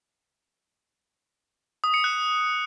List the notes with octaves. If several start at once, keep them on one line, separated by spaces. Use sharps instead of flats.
D#6
C#7
F#6